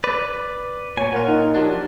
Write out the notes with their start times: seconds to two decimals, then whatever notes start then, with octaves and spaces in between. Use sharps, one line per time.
0.04 B4 D5
0.97 A#2 C#5 G#5
1.12 A#2 F4 A#4 F#5
1.28 D#4
1.55 F3 F#3 D4 G4